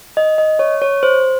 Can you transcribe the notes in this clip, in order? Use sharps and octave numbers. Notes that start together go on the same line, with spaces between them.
D#5
D#5
C#5
C#5
C5